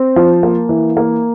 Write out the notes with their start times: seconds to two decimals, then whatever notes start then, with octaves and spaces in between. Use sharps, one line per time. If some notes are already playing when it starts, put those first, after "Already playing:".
Already playing: C4
0.16 F3
0.43 A#3
0.69 E3
0.97 A#3